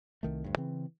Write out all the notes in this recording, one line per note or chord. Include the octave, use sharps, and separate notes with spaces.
C2 D#3 A3
D2 G2
C#3 E3 C4